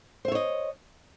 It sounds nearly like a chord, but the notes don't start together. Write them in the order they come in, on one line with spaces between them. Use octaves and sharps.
C5 E5 C#5 D#5